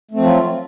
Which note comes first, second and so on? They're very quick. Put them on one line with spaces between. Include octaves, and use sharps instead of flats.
A3 C4 F3 F#3 F4